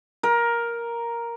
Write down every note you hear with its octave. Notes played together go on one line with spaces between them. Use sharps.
A#4